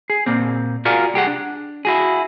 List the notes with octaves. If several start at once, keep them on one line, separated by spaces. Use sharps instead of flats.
G#4
A#2 A#3 C4
F4 F#4 G#4 A#4 D5 F5
C2 G4 G#4 F#5
D4
E4 F#4 G#4